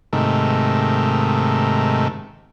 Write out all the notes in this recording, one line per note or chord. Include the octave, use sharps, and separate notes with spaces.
G#2 C3 D#3 A3